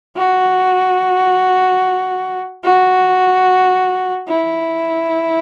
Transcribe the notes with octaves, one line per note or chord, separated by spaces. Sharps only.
F#4
F#4
E4